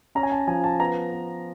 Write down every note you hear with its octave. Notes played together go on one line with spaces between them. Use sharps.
C#4 A#5
G#5
A5
F3 G#5
A5
B3 A#5
B3